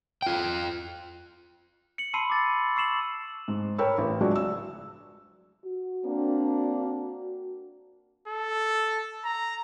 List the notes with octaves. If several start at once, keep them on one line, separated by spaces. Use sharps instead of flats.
F4 G5
C#7 F#7
A5 B5 C6 E6 C7 D#7
D6 A6
C#6 E6 C7 E7 F#7
G#2
A#4 C#5 G5 B5 E6
A1
F3 F#3 G#3 D4 F#4
E6
F#4
A#3 C4 D4
A4
A#5